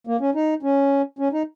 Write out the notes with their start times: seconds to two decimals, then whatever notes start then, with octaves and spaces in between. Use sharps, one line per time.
0.07 A#3
0.20 C#4
0.35 D#4
0.63 C#4
1.19 C#4
1.33 D#4